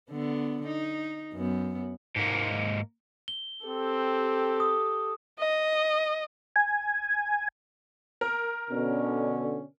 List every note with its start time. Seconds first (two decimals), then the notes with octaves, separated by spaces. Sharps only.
0.10 D3 B3
0.67 D#4
1.33 F#2 B3
2.16 G#2 A#3
3.28 G7
3.66 C4 G4 A4
4.60 D#6
5.40 D#5
6.56 G#5
8.21 A#4
8.70 B2 D3 C#4